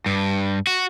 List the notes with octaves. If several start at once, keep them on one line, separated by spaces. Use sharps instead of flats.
G2
F#4